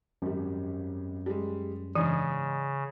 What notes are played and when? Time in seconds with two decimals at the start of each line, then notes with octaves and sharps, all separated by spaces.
0.22 G#1 F#2 G3
1.26 G3 G#3
1.95 G#2 C#3 E3 D4 D#7